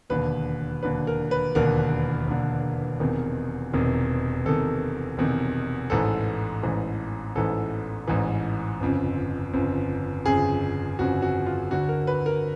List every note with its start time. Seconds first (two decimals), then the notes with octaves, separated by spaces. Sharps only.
0.10 E1 D#2 D3 B4
0.83 E1 D#2 D3 B4
1.07 A#4
1.31 B4
1.55 E1 D#2 D3 A#4
2.27 E1 D#2 D3
3.00 E1 E2 C3 D#3
3.73 E1 E2 C3 D#3
4.46 E1 E2 C3 D#3 A4
5.18 E1 E2 C3 D#3
5.90 A1 G#2 E3 A4
6.63 A1 G#2 E3
7.36 A1 G#2 E3 A4
8.08 A1 G#2 E3
8.80 G1 F2 C#3
9.53 G1 F2 C#3
10.26 G1 F2 C#3 G#4
10.99 G1 F2 C#3 F#4
11.22 F#4
11.46 F4
11.71 D2 D3 F#4
11.89 A#4
12.07 B4
12.26 A#4